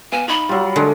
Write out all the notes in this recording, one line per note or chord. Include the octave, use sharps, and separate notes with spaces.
B3 F5 G#5 E7
D#4 B5
F#3 G3 F4
D3 G#3 D4